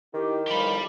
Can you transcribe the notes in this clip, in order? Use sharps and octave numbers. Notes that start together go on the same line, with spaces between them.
D#3 D#4 E4 G4
B1 E2 F3 G4 B5